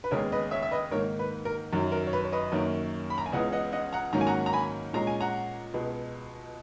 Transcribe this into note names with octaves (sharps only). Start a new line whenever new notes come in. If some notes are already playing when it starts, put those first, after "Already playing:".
B4
D#2 C#3 G#3 B3 A#4 C#5
B4 D#5
C#5 E5
E5
B4 D#5
G#2 D#3 A#3 A#4 C#5
B4
A#4
F#2 D#3 F#3
A#4
C#5
B4
C#5
B4 D#5
F#2 D#3 A#3 C#4
B5
A#5
G#5
C#2 C#3 E3 B3 D#5 F#5
D#5 F#5
D#5 F#5
F#5 A#5
G#2 D#3 F#3 A#3 C#4 A#5
G#5
F#5 A#5
A#5
G#5 B5
A#2 G#3 C#4 A#5
G#5
F#5 A#5
C#2 B2 G#3 B3